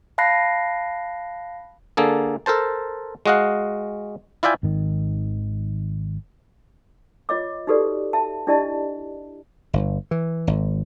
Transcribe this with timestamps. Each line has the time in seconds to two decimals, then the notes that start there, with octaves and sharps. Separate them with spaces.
0.18 F5 A5 B5 F#6 A#6 C7
1.97 D3 A#3 G#4 A4
2.46 A4 A#4 C5 A5
3.26 G#3 F#4 D#5 F5 F#5
4.43 E4 F4 D5 E5 G5 G#5
4.63 G#1 D#3
7.29 F4 C#5 D#5 D6
7.67 D#4 F#4 G4 A4 B4 D5
8.13 E5 A5
8.47 D4 E4 G4 D5 D#5 A5
9.73 G1
10.11 E3
10.47 G#1